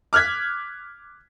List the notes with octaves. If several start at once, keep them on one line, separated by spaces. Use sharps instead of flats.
D6 F6 F#6 G#6 B6